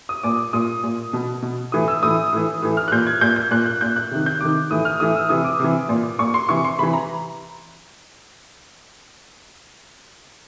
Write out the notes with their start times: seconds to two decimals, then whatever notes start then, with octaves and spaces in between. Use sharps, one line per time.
0.09 D#6
0.23 A#2 D6
0.53 A#2 D#6
0.83 A#2
1.13 B2
1.42 B2
1.72 A2 E3 D#6
1.88 E6
2.03 A2 E3 D#6
2.32 A2 E3
2.62 A2 E3
2.77 F6
2.88 F#6
2.92 A#2 G6
3.07 G#6
3.21 A#2 G6
3.36 G6
3.51 A#2 F#6
3.66 F#6
3.81 A#2 G6
3.96 F#6
4.11 C3 D#3
4.26 G6
4.41 C3 D#3 D6
4.71 A2 E3 D#6
4.85 F6
5.00 A2 E3 D#6
5.15 E6
5.29 C3 E3 D#6
5.45 D6
5.60 C3 E3
5.89 A#2
6.19 A#2 C#6
6.34 C6
6.49 C3 E3 C#6
6.64 C6
6.78 C3 E3 B5
6.93 A#5